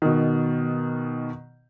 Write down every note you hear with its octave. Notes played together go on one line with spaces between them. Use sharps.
B2 D#3